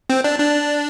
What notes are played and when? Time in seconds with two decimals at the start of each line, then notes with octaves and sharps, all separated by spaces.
0.10 C4
0.24 D4
0.40 D4